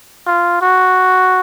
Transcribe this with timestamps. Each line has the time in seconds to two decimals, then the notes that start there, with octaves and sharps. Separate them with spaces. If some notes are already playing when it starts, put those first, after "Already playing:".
0.27 F4
0.61 F#4